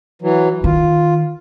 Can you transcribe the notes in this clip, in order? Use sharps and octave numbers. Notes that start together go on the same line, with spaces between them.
E3 F#3
D#3 F4